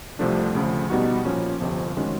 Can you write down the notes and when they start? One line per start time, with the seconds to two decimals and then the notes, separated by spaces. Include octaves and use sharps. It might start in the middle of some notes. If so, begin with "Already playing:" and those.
0.19 C2 C3 F3 A3 D4
0.55 D2 C#3 F3
0.90 B2 G3 B3 D#4 F#4
1.25 A#2 F3 A#3 C#4
1.61 G1 F2 C3 F3
1.97 D#3 G#3 C#4 F#4